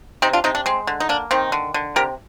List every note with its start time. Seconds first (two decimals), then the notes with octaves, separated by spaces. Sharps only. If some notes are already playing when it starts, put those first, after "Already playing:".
0.22 C3 C4 D#4
0.33 D4 F4
0.44 C3 C4 D#4
0.55 D4
0.66 G#3 C4
0.87 D3
1.00 D#4
1.09 A#3 D4
1.31 D#3 C4 D#4
1.52 D3
1.74 D3
1.96 C3 G4 A#4